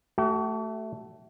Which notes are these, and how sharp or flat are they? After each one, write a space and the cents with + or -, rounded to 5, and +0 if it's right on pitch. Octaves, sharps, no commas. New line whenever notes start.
A3 +0 F#4 +45